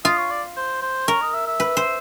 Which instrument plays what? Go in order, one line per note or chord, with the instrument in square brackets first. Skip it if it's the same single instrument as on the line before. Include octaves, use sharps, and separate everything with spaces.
[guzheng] F4 [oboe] D#5
[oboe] C#5
D5
C5
C5
[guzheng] A#4 [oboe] C#5
[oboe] D#5
E5
E5
[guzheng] B4
C5